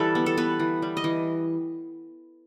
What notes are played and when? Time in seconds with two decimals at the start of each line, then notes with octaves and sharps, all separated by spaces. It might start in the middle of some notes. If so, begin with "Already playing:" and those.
Already playing: E3 G3 E4 A4 B4
0.15 B3
0.26 A4
0.38 B3 B4
0.60 E3
0.82 G3
0.97 D#5
1.04 E3